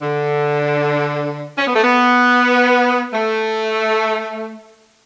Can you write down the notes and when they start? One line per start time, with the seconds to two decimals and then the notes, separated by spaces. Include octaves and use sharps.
0.02 D3
1.58 C#4
1.67 B3
1.75 A3
1.84 B3
3.13 A3